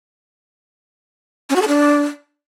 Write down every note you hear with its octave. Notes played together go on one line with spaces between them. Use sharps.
C#4
F#4
A4
D4